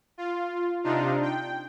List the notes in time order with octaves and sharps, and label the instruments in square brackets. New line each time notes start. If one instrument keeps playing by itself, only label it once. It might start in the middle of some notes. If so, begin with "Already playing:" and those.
[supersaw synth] F4
C3 D4 D#4 F4
G5